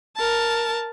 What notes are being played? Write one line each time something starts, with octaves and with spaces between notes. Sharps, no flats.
A#4 A5